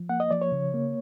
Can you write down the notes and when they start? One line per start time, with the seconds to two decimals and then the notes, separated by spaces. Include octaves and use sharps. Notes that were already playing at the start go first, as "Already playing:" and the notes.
Already playing: F3
0.09 A#3 F#5
0.20 D#5
0.31 F3 D5
0.41 C#5
0.52 C#3
0.74 A#3